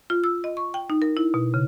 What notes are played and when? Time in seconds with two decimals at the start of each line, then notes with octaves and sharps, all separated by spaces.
0.10 F4
0.24 E6
0.44 D#5
0.57 C#6
0.74 G5
0.90 D#4
1.02 A#4
1.17 E4
1.34 B2
1.54 C#3